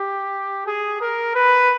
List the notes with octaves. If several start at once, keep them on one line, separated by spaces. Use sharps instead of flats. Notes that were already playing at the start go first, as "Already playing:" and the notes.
Already playing: G4
G#4
A#4
B4